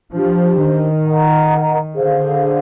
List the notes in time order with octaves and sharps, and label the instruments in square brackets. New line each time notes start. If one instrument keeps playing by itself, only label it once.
[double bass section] F3 [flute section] D4 G4 C5
[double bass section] D#3
[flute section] A#4 D#5 F#5 A#5
[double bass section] D3 [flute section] G#4 C5 F5